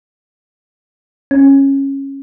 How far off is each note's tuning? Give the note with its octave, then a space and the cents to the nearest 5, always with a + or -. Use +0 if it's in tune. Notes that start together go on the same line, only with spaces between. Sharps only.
C#4 -15